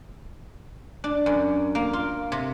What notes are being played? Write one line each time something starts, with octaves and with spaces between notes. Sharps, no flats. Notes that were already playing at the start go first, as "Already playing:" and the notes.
D4
F#2
A#3
F4
C3